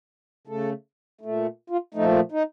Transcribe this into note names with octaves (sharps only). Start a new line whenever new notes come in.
C#3 A3 A4
A#2 A3
F4
A#2 F3 A3 D#4
D#4